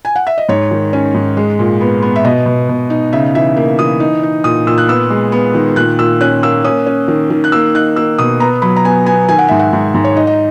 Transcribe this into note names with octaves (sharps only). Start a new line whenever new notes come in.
G#5
F#5
E5
D#5
G#2 C#5
D#3
C#4
G#2
G#3
A#2
B3
B3
E5
B2 D#5
B2
B2
D#4
C#3 E5
E3 E5
A#3
E3 D#6
D#4
D#4
A#2 D#6
A#2 E6
F#6
B3 E6
G#3
B3
D#3
A#2 F#6
A#2 E6
C#4 F#6
A#3 E6
C#4 D#6
C#4
D#3
D#3
F#6
A#3 E6
D#4 F#6
A#3 E6
B2 D#6
B3 A#5
F#3 B5
A#5
B3 G#5
B3 G#5
D#3 G#5
F#5
G#2 E5
F#5
G#2
G#2
C#5
D#4 D#5
D#5